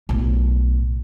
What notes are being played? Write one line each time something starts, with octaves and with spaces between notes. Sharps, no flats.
B1 A2